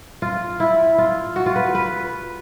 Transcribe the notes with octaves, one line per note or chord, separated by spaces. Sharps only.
F4
E4
F4
F#4
F4
B4
B4